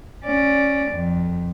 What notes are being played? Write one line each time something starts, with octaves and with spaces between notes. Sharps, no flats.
C#4 D5
F2